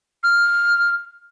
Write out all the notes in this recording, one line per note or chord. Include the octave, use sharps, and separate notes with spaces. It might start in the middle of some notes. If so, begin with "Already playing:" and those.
F6